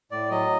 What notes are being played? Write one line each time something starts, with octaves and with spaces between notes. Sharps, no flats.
A2 D5
F#3 D#5